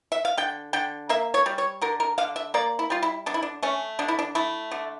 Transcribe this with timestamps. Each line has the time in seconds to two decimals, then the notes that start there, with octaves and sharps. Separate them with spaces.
0.12 E5
0.25 F5
0.38 D3 G5
0.73 D3 G5
1.09 A#3 E5
1.34 C#5
1.46 G3
1.58 C#5
1.82 D3 A#4
2.00 A#4
2.18 D3 F5
2.36 E5
2.54 A#3 D5
2.79 E4
2.90 G3 F4
3.02 E4
3.26 D3 D4
3.34 E4
3.42 D4
3.63 A3 C#4
3.99 D3 D4
4.08 E4
4.19 D4
4.35 A3 E4
4.72 D3